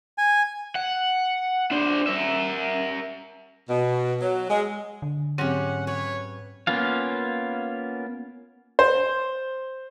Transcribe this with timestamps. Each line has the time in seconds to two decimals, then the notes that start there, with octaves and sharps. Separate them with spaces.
0.18 G#5
0.75 F#5
1.71 D4 C5
2.07 A#4 E5
3.69 B2
4.21 F#3
4.50 G#3
5.02 D3
5.38 G#2 F#3 C4 C#4 G4 F#5
5.87 B4 C#5
6.67 A#3 B3 C#4 F4 F5
8.79 C5